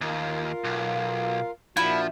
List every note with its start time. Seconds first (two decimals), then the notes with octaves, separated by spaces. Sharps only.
0.01 D#2 F4 A#4 F5
0.64 B1
1.77 A#2 F3 D4 E4 F#4